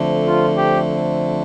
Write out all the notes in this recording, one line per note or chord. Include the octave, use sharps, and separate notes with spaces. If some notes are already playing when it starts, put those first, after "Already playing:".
Already playing: D3 F3 A3 C4
F4
G4